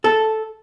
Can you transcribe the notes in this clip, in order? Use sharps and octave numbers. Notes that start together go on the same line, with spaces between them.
A4